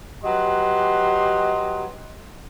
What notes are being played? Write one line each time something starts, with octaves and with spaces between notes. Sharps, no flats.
F#3 G4 B4 D#5 C6